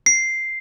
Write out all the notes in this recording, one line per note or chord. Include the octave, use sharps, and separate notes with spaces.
C7